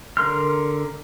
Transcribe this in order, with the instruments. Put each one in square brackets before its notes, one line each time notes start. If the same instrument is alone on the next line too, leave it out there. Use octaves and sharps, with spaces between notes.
[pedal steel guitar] D3 A#4 C6 F6